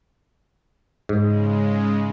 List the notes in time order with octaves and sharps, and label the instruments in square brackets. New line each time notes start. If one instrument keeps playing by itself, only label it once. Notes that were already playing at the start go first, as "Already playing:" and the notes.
[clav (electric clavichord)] G#2 [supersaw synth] C#3 G#3